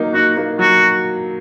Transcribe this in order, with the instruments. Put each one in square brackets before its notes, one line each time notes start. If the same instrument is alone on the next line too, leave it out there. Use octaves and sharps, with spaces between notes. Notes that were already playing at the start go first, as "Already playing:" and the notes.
Already playing: [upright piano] F#3 A#3 D#4
[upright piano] D#4 [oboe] F#4
[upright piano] A#3
[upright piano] F#3 [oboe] F#4